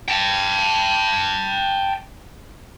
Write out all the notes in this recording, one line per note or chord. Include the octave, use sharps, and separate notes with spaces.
G5 A5